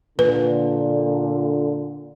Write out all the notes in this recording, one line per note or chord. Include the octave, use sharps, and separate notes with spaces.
A#2 D3 B4